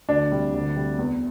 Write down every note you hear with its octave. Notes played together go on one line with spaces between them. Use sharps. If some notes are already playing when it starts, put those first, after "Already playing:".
D2 D4
C3 G3
D2
C3 G3
E2